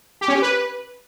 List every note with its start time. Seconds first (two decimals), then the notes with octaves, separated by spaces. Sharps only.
0.21 G4
0.28 C#4
0.35 G4
0.42 B4